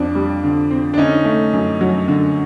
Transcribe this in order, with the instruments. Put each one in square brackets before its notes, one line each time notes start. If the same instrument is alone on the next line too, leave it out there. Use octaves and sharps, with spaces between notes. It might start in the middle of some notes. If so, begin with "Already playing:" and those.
Already playing: [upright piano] F2 C4 [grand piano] D4
[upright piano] G3
D3
C4
[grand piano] D4
[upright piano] D3 [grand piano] C#4 D#4
[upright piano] A3
F#2
F#3
D3